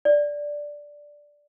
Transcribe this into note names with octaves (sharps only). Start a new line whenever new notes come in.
D5